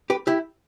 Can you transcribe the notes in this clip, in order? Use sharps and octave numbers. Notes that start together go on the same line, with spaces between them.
G4 B4
E4 G4